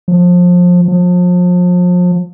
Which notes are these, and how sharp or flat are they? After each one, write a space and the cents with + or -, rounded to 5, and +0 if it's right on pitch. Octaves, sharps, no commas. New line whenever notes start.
F3 +25
F3 +35